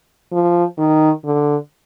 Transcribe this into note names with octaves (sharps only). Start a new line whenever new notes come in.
F3
D#3
D3